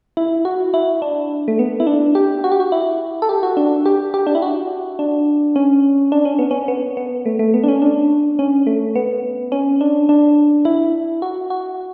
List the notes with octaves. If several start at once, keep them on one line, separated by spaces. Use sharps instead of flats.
E4
F#4
E4
D4
A3
B3
E4
D4
G4
F#4
G4
F#4
E4
A4
G4
F#4
D4
G4
G4
D4
E4
F#4
D4
C#4
D4
C#4
B3
C#4
B3
B3
A3
A3
B3
D4
C#4
D4
C#4
A3
B3
C#4
D4
D4
E4
F#4
F#4